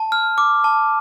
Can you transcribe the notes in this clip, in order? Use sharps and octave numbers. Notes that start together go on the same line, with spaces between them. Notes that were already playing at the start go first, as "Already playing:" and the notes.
Already playing: A5
F6
D6
A5